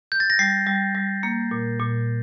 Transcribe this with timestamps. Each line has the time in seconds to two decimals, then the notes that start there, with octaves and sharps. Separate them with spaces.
0.12 G6
0.20 A6
0.30 A#6
0.39 G3 C7
0.67 G3
0.95 G3
1.23 A#3
1.51 A#2
1.80 A#2